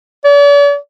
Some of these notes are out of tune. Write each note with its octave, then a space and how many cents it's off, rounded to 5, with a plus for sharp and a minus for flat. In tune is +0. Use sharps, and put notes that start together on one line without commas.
D5 -45